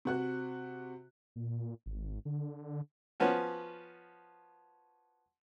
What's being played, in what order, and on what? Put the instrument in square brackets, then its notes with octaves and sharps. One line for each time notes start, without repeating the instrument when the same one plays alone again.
[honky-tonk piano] C3 F#4 F#6
[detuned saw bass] A#2
G#1
D3
[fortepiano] F3 B3 C#4 F#4